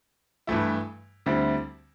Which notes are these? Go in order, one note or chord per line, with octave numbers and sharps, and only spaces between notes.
G2 E3 A3 E4
D2 D3 G3 C4 E4